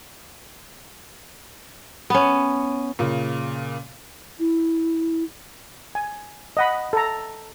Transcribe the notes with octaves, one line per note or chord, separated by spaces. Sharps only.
B3 C#4
A#2 C#3
E4
G#5
D#5 F#5 B5
A4 A#5